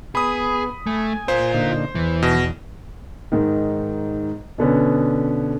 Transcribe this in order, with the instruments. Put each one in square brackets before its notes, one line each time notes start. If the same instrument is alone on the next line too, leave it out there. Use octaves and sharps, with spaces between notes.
[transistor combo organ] B3 [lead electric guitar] G#4 [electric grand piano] B5 D#6
[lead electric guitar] A3 [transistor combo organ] G#5
[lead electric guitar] F4 A#4 [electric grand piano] C5
[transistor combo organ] A#2 D3 D#4
[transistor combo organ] E2 [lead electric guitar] E3
[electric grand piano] B2
[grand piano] G#2 D#3
B2 D3 B3 C#4